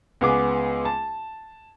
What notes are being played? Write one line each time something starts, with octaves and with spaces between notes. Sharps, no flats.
C#2 B3 G#4 D6
A5